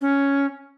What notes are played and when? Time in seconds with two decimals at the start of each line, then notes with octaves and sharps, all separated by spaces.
0.01 C#4